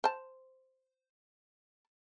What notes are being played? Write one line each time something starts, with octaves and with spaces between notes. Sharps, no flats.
C5 A5